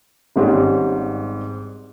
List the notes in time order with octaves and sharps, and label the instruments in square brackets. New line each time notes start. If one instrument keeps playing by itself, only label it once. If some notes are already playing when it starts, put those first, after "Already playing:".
[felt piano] G#1 G#2 G3 C#4